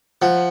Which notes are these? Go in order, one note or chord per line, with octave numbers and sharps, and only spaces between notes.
F3 F#5